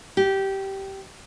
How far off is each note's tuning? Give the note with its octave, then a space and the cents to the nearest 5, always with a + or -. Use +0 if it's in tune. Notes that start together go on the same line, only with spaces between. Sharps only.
G4 -15